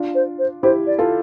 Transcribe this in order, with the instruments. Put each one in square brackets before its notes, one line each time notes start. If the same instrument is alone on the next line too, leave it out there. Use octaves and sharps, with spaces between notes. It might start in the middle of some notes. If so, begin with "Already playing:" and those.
Already playing: [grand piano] D4 F4
[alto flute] C5
C5
[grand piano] E4 G4 [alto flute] C5
[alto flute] D5
[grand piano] F4 A4